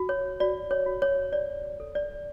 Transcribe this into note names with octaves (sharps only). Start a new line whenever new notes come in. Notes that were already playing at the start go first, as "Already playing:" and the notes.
Already playing: F#4
C#5
F#4 D5
C#5
F#4
C#5
C#5 D5
A4
D5